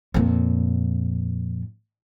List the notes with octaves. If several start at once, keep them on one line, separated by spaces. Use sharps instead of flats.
F2 A#2